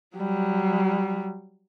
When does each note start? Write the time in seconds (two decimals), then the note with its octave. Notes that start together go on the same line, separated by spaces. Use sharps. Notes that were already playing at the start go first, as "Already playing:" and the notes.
0.16 F#3 G3